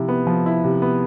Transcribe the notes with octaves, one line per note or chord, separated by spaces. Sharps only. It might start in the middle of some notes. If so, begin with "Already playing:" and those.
Already playing: C3 F3 E4
B3
F3
E4
C3
B3